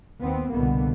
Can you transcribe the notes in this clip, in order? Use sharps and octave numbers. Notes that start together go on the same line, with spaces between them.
D#2 B3 C4
C2 B2 D3 A#3 B3